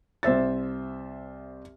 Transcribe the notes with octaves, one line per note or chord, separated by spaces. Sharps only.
C2 C5 E5 A6